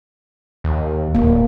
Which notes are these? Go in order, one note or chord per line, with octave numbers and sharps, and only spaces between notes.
D#2
D1 A#3